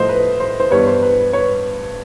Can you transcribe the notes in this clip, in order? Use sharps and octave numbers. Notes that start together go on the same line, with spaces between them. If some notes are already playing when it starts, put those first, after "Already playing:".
Already playing: A2 F3 A3 C5 D#5 F5
B4
C5
C5
G2 E3 G3 B3 B4 C#5
C5
B4
B4 C#5